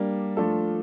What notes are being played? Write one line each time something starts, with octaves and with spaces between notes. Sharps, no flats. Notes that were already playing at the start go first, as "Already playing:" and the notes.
Already playing: G3 A#3 D4
F3 A3 D4 F4 A4